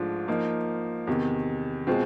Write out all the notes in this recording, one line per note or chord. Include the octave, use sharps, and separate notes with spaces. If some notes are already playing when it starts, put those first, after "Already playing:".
Already playing: G#2 F3 A3 D4 F4
F3 A#3 D#4
E2 C3 D#3
B2 G#3 C4 F4